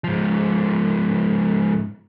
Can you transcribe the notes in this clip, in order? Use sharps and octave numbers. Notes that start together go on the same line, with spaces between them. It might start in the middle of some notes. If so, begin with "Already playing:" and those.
G#2 F3